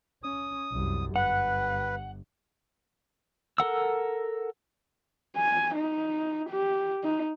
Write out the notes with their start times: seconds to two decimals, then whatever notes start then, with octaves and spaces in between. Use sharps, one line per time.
0.23 C#4 D#6
0.72 C2 F#2
1.16 G1 B4 F#5
3.58 A4 A#4 F#5 E6
5.36 G#5
5.75 D#4
6.49 G4
7.03 D#4